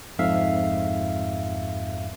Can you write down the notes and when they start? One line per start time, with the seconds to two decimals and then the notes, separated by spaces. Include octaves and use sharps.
0.19 F2 G#2 E5 F5